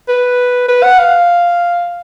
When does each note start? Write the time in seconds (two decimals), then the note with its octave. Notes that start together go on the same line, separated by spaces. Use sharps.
0.08 B4
0.68 B4
0.83 F#5
0.99 F5